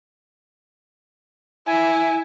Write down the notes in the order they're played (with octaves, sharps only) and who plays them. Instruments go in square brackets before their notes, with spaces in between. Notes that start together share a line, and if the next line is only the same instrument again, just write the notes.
[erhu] E4 [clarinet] G#5